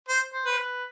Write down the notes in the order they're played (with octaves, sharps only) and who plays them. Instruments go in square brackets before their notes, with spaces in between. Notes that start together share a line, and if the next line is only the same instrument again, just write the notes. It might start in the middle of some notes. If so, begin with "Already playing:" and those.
[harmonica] C5
[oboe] C5
[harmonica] B4
[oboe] C5
B4